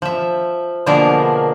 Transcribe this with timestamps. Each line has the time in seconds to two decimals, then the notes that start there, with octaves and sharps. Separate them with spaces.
0.02 F3 E5
0.86 B2 D3 F3 A#3 G#4 A#4